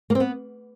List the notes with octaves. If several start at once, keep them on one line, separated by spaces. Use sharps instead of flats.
A#3
C4
B3